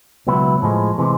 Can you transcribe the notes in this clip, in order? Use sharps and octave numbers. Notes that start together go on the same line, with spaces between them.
C#2 B2 F#3 B3 E4
A2 F3 G#3
C3 E3 G#3